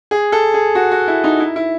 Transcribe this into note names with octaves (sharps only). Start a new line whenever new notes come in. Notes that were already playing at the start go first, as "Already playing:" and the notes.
G#4
A4
G#4
F#4
F#4
E4
D#4
E4
E4